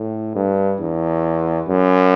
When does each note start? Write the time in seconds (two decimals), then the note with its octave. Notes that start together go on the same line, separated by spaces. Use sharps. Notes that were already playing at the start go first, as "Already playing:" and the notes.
Already playing: A2
0.36 G2
0.81 E2
1.69 F#2